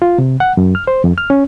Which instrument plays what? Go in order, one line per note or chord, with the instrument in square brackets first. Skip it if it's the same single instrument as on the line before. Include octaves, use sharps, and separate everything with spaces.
[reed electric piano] F4
C3
F#5
F#2
F6
C5
F2
F6
C#4